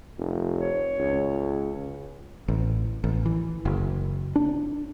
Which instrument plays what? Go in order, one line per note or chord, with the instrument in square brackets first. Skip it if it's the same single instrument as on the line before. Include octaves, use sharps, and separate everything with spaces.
[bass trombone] F1
[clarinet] C#5
[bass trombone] C#2
[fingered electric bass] A1
A1
E3
F#1
D4